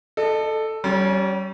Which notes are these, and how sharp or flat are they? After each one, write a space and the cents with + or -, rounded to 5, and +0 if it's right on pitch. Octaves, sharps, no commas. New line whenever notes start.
A4 +0 D#5 -40
G3 -35 C#4 +0